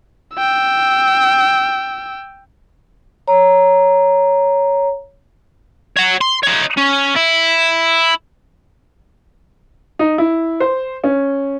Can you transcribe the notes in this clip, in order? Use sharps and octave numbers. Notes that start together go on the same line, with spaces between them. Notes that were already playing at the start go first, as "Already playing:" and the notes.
G5 E6
C#5 A#5
C#5 F#5
C6
D#4 C#5
C#4
E4
D#4
E4
C5
C#4